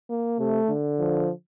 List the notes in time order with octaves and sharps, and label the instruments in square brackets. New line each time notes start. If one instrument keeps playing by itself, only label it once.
[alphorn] A#3
[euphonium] C3 [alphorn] A3
[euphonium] D3
[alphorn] F3